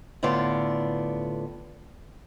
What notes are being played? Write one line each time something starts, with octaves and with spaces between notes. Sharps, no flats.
A2 D3 B3 F4 D5